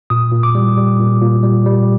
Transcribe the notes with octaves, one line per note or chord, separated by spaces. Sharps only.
A#2 D#6
A#2
D6
G3
G3
A#2
A#2
G3
G3